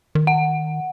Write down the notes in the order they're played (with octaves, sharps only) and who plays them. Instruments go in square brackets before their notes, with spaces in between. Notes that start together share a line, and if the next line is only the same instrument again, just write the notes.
[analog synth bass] D#3
[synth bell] F#5